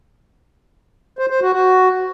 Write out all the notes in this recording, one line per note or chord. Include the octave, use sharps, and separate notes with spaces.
C5
C5
F#4
F#4